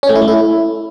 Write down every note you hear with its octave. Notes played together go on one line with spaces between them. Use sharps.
C#4
A3
E4
A3
E4